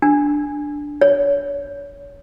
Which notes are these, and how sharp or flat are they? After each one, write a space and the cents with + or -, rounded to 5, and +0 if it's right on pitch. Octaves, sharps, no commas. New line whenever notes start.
D4 +0
C#5 +30